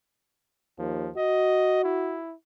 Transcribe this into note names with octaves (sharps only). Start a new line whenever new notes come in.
D#2 F3
F#4 D#5
E4